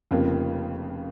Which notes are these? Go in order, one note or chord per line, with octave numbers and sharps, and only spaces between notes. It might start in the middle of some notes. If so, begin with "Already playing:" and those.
F1 F2 C#3 F3 A#3